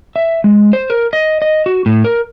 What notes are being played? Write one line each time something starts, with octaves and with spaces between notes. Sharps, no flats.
E5
G#3
C5
A#4
D#5
D#5
F#4
A2
A#4